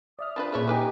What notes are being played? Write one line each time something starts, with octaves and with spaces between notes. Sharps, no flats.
D5 E5 D#6 F6
F3 D4 B4 D5 B5 A6
A#2 C#4 E4 G#4 B4 C#5 B6
C#4 D#4 G4 B4 G#5 D6